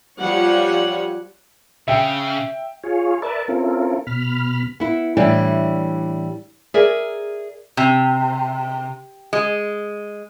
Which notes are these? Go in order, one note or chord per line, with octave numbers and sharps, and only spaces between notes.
F3 G3 C#5 F#5
C#3 E5 G5
F4 G#4 C#5
A#4 B4 D5 E5 A5
C4 C#4 E4 F4 A4 A#4
B2 B5 F6
B3 E4
A2 E3 G3 D4 E4 G5
G#4 A#4 D5 E5
C3
G#3